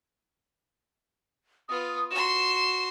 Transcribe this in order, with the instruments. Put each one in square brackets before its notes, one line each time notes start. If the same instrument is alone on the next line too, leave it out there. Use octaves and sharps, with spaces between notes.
[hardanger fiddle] B3 F4 [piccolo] D#6
[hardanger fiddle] F#4 C6 [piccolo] E7